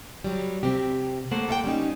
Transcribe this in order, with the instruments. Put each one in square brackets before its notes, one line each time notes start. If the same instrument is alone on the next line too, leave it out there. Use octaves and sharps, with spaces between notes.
[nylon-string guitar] F#3 G3
[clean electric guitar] C3 [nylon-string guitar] C4 G4
[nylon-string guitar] A3 [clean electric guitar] A#3 C5 F#5
[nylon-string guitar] A4 F5 G5
G3 C#4 D#4